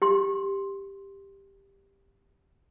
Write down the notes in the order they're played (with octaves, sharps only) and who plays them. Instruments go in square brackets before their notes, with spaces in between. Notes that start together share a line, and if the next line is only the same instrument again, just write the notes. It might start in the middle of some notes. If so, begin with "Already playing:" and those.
[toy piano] G4 C6